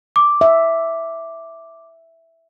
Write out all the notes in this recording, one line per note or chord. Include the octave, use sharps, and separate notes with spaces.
D6
E5